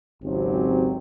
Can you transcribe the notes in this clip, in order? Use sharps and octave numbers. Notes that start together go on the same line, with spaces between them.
G#1 C#2 F#3 C4 G4